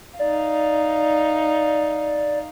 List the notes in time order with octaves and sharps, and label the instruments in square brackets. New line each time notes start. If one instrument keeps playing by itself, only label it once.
[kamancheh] D#4 F5 [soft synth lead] D5